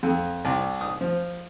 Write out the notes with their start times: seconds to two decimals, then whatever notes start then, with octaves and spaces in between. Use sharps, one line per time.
0.03 F2
0.45 C2
0.81 D#6
1.01 F3